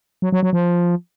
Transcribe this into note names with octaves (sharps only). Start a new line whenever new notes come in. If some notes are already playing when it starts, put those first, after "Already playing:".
F#3
F#3
F#3
F3